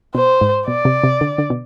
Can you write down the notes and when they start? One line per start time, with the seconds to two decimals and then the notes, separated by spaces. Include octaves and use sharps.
0.15 B2 C5
0.41 G#2
0.67 B2 D5
0.85 C3
1.04 C3
1.21 D3
1.38 D3
1.50 B2